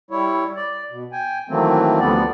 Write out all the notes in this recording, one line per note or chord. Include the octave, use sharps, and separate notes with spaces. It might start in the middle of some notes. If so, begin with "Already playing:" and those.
G3 E4 C#5
D5
B2
G5 G#5
D#3 E3 F#3 A3 A#3 C4
D2 D3 F3 G3 B3 D5